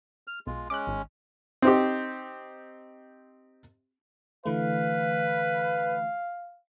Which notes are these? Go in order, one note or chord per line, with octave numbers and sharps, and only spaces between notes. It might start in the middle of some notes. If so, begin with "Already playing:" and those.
F6
B1 G#3 F4
G#3 C#4 D6 F#6
G#1
C4 D#4 G4
D3 E3 A3 B4 F5